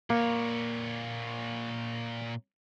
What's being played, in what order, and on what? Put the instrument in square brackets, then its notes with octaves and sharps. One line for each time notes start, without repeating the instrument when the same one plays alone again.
[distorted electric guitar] A#2 C#5 [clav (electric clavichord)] A#3